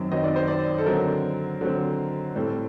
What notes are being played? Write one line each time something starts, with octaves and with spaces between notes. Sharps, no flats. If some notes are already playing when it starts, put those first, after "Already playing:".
Already playing: F#2 D#3 F#3 C4
F#2 D#3 F#3 C4 D#5
D5
C5
D5
A4
D3 F#3 C4 A#4
D3 F#3 C4
A2 G3 C4 A4